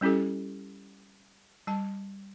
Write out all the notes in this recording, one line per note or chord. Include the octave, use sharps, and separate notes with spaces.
G3 C#4 E4 G4 A4
G3 A5